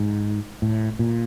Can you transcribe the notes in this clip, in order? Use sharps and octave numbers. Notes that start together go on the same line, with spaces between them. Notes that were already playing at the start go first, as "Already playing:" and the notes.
Already playing: G#2
A2
A#2